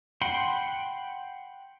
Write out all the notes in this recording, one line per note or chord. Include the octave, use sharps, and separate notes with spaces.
F#5 G5 B5 C6